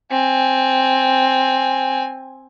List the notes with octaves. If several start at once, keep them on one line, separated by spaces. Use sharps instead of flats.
C4 G#5